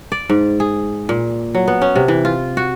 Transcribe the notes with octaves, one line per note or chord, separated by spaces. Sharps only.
D5
G#2
G#4
A#2
F#3
B3
C#4
C3
E3
F4
F#4